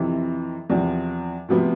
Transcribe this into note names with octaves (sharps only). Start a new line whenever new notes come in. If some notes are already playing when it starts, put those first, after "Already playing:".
Already playing: F2 C3 E3
E2 C3 F3
D2 C3 F3 B3